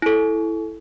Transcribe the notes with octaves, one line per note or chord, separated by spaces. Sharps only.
E4 A4